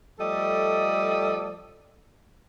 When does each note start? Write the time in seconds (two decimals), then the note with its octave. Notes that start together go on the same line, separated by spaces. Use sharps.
0.20 F3 G3 A3 A4 D5 D#5